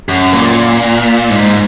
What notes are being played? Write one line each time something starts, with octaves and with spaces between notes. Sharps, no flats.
F#2
A#2
G#2